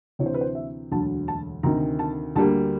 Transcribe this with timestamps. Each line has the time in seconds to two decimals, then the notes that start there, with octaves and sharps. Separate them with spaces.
0.19 D2 C3 E3 C#5
0.26 C5
0.34 B4
0.41 C5
0.55 E5
0.91 E1 D2 D3 F#3 A5
1.28 A5
1.63 D2 C3 D#3 A#5
1.99 A5
2.36 D2 D3 G3 A#3 A5